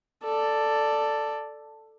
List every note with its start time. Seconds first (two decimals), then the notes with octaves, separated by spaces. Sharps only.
0.23 A4 D5